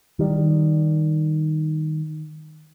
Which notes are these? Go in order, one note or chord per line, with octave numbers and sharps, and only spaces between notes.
D#3 G3